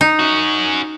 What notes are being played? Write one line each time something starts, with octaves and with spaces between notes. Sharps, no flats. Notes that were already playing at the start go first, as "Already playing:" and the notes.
D#4
C#4 F#4